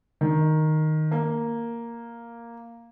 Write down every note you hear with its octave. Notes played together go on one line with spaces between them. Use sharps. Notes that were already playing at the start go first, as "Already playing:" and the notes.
D#3
A#3